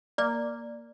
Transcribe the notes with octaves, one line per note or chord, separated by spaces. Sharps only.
A#3 D5